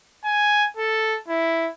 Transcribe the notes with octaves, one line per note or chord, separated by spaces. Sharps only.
G#5
A4
E4